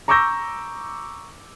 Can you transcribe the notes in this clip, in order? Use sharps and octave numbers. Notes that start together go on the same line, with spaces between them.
A#5 C#6 D6 E6 G6 A#6